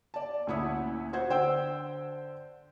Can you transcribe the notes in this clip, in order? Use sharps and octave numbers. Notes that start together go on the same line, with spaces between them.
D5 A5
D2 A#2 C#4 E4 F#5 D#6
F#4 C5 F#5 G#6
D3 C5 G5 E6